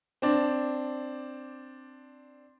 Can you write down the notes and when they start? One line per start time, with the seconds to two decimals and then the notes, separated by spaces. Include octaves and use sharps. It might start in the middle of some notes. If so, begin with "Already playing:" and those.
0.22 C4 D4